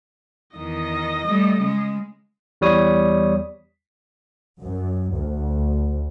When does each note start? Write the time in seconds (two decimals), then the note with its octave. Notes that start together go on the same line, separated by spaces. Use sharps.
0.57 E2 D#3 D#5 D#6
1.27 G3 A3
1.61 C#3 G#3
2.61 E2 G3 C#5 D#6
4.61 F#2
5.14 D2